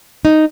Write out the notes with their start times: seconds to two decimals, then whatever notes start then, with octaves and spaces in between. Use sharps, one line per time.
0.25 D#4